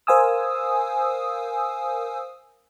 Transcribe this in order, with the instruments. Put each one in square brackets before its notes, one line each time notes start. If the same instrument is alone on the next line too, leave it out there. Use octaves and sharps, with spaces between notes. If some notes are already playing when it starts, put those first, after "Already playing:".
[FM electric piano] A#4 C5 F5 G#5 D#6 E6